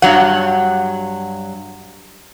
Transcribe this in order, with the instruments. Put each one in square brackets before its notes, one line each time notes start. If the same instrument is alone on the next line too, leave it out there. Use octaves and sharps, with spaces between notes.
[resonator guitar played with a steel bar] G2 F#3 F#5